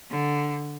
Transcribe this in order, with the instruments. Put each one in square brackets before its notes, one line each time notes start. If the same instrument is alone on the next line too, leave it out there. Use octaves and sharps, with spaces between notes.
[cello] D3